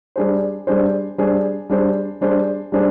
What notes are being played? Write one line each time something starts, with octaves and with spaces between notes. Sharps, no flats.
G3 D4 G#4 C5
G3 D4 G#4 C5
G3 D4 G#4 C5
G3 D4 G#4 C5
G3 D4 G#4 C5
G3 D4 G#4 C5